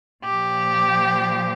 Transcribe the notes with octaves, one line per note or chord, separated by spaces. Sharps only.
A#2 F3 G4